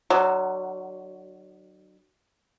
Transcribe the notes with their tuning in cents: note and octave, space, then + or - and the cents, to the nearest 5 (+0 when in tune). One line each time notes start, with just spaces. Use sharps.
D3 +45 F#3 +15